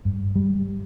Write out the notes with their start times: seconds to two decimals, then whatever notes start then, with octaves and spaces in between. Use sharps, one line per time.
0.05 G2
0.36 G3